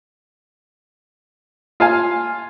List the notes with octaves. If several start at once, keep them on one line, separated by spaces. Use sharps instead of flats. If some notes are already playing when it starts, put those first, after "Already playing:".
F4 F5 G#5